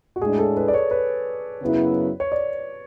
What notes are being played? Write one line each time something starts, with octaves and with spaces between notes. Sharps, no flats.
F#4
A2 G#3 D4 G#4
A4
B4
D5
C#5
B4
F#2 C#3 F#3 B3 E4
C#5
D5